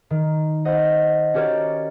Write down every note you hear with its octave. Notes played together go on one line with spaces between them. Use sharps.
D#3
C5 D#5 F#5
C#4 F#4 G4 A#4 C#5 D5